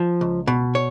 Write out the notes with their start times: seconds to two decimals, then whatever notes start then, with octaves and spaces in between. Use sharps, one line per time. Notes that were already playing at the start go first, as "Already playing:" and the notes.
Already playing: F3
0.21 C#2
0.47 B2
0.75 C#5